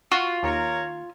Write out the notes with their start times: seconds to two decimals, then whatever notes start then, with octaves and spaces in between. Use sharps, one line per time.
0.12 F4 F#4
0.43 D#2 A#4 C#5 A#5